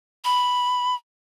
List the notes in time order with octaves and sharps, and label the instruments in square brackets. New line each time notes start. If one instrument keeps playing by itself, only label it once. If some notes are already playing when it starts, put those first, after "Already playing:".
[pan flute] B5